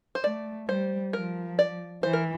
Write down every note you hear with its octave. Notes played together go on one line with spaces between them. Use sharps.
C5
A3 D5
G3 C5
F3 A#4
D5
E3 C5
A#4